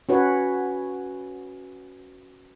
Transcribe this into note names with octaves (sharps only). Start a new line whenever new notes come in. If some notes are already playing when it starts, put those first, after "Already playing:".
C#4 F#4 B4 C#5